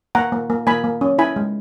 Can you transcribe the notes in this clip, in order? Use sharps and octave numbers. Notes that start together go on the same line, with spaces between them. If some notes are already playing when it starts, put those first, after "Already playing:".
A#3 F#5 A#5
A#3
A#3
A#3 G#5 B5
A#3
C#4
E4 G#5 B5
G#3